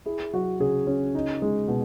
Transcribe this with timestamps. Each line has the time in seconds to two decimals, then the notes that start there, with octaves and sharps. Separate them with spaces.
0.06 E4 G#4
0.33 F#3 F#4
0.60 C#3 G#4
0.87 C#4
1.15 D#4
1.42 G#3
1.68 B2